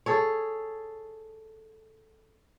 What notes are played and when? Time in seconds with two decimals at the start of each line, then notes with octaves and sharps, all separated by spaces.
0.06 G#4 A4 C#5